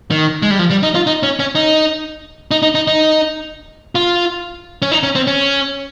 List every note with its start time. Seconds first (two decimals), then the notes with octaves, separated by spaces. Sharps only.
0.11 D#3
0.42 G#3
0.51 G3
0.59 F3
0.71 G3
0.83 D#4
0.95 F4
1.07 D#4
1.23 C#4
1.39 C#4
1.55 D#4
2.51 D#4
2.62 D#4
2.75 D#4
2.87 D#4
3.95 F4
4.82 C#4
4.91 D#4
5.03 C#4
5.15 C4
5.27 C#4